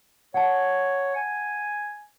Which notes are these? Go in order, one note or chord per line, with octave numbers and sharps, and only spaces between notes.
C#5 F#5 A5
G#5